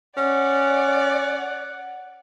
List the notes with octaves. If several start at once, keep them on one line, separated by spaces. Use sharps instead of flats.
C#4 D5 F#5